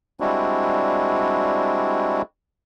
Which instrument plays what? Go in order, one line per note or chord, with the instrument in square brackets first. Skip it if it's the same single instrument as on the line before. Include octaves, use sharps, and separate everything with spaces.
[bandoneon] G3 G#3 C4 D4 E4 F#4